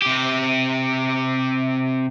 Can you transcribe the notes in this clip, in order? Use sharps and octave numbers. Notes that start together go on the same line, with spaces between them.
C3 G4